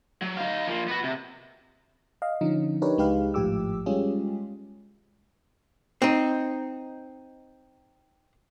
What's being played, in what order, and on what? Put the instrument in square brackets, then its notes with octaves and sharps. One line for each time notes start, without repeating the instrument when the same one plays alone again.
[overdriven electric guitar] F#3
D#4 F5
F3 A#3
B3 F#4
C3
[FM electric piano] D#5 F5
D3 F3 C#4 D#4
D4 D#4 G4 A#4 B4 C#5
C#2 G#3 D#4 G4 B4 F5
G#1 A2 F3 G4 D6 E6
G3 G#3 C#4 F4 G4 G#4
[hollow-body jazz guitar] C4 D#4